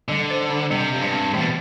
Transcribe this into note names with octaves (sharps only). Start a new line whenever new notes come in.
D3 G3
C5
D4
C3 G3
F2 G4
G2
C4
A2 E3
B2